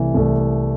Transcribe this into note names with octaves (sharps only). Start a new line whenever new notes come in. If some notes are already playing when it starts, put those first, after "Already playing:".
Already playing: C2 C3 E3 A3
C2 C3 E3 A3